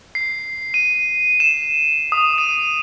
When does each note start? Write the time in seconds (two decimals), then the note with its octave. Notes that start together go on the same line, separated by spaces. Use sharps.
0.15 C7
0.74 D#7
1.40 E7
2.12 D#6
2.38 D#7